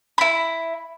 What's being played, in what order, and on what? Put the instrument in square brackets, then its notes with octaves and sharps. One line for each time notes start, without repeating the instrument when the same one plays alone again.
[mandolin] E4 B5